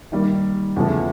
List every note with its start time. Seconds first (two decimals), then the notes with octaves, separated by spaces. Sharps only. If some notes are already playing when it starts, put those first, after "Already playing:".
0.12 D#3 G3 A#3
0.76 E2 C#3 F3 A3